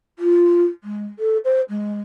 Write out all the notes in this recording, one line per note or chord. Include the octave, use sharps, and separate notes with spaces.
F4
G#3
A4
C5
G#3